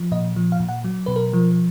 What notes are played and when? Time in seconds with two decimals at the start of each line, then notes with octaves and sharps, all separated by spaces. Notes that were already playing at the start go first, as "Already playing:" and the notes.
Already playing: F3
0.12 A#2 D#5
0.36 F3
0.52 F5
0.60 A#2
0.69 F#5
0.84 F#3
1.06 B2 B4
1.16 A#4
1.33 F3